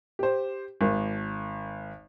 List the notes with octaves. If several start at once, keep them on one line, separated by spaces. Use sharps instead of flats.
G4 C5
G#1